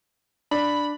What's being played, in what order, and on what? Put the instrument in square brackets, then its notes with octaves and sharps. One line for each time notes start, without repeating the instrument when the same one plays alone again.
[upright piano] D4 [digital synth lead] B5